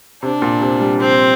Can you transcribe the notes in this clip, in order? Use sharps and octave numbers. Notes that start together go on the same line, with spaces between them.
C3 D4
A#2
C3
G3
F3 C4